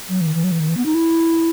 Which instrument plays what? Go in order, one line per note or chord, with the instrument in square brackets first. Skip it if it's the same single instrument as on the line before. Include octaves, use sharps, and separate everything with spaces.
[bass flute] F#3
E3
D#3
E3
F#3
E3
D#3
E3
B3
D#4
E4